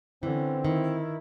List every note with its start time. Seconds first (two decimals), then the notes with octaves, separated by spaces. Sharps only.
0.23 D3 E3 C4 C#4
0.65 D#3 E4